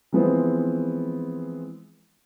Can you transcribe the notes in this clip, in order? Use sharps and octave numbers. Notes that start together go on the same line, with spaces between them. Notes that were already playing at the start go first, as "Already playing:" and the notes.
E3 F3 G#3 B3 C4